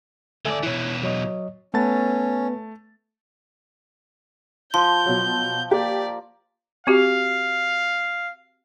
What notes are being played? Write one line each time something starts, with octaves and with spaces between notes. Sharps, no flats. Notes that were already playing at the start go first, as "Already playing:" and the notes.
D2 A4 D5 E5 G#5
B2 E3 E4 C#5
F#3 C#5 D#5
A3 B3 C#4 B4 A5 A6
F3 C6 G6
B2 F#3
A#3 G4 D5
C4 F#4 G4 F5